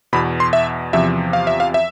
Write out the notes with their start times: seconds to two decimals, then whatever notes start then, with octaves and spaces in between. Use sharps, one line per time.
0.13 E2 B2 B5
0.40 C6
0.53 E5
0.93 E2 C3 F3 E5
1.33 F5
1.47 E5
1.60 F5
1.74 E5